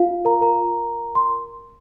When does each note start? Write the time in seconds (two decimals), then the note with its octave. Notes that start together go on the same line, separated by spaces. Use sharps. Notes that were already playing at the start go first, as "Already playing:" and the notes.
Already playing: F4 F5
0.25 A#4 A#5
0.41 A#4 A#5
1.15 C6